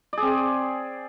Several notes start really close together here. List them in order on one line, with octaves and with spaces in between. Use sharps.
D5 G#4 C4